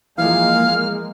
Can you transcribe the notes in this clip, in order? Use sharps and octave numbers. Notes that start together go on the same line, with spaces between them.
E3 F3 G#3 A#3 F5 F6